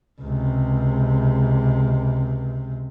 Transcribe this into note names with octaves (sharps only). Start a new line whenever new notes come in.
C#2 C3